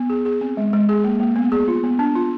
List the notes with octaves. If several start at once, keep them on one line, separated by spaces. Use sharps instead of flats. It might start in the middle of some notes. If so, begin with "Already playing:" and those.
Already playing: B3
G#4
G#4
C4
G#3
G#3
G#4
A#3
A#3
B3
G#4
F4
B3
D4
F4